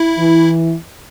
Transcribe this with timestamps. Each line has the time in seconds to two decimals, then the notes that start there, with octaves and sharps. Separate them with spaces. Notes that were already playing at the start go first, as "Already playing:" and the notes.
Already playing: E4
0.18 E3